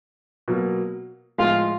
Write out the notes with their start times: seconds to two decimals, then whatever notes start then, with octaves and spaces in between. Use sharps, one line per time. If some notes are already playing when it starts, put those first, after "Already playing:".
0.48 B2 F#3 A#3
1.38 A2 F3 G#3 F4